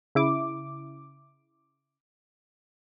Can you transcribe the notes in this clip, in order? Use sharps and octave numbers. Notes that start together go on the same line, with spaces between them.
C#3 E4 D6